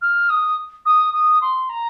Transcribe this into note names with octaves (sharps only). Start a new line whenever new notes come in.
F6
D#6
D#6
D#6
C6
A#5